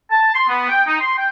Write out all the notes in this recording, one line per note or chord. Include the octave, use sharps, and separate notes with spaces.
A5
C6
B3
G5
D#4
C6
G5